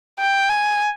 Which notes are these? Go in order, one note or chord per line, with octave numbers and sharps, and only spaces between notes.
G5
G#5